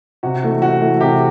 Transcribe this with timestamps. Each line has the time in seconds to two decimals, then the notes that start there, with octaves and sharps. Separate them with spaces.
0.23 C3 F#4
0.43 E3 A3
0.62 C3 F#4
0.81 E3 A3
1.01 C3 G4